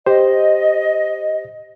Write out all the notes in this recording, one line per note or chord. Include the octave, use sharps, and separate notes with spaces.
G4 C5 D#5